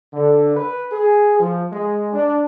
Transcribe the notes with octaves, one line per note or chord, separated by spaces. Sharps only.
D3
B4
G#4
F3
G#3
D4